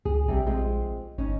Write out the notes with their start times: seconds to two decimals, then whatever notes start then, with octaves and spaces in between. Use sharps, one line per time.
0.05 C#2 G#4
0.28 A#1 C3 G3
0.47 G#3 C4 F4
1.18 G1 C#4 D#4